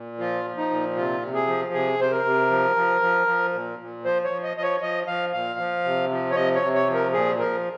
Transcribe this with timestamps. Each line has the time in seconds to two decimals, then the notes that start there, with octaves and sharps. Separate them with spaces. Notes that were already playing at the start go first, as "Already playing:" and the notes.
Already playing: A#2
0.19 F3 F4
0.44 F3
0.57 D#4
0.70 A#2
0.96 C3 F4
1.22 C3
1.34 G#4
1.47 F3
1.73 C3 G#4
1.99 C3 C5
2.11 A#4
2.25 C3
2.50 F3
2.76 F3
3.01 F3
3.27 F3
3.53 A#2
3.79 A#2
4.05 F3 C5
4.24 C#5
4.30 F3
4.43 D#5
4.56 F3 D#5
4.63 C#5
4.81 F3 D#5
5.07 F3 F5
5.33 A#2 F5
5.59 F3
5.84 C3
6.10 F3
6.31 C#5
6.35 C3 D#5
6.55 C#5
6.62 C3
6.75 C#5
6.88 F3
6.94 A#4
7.13 A#2 G#4
7.38 F3 A#4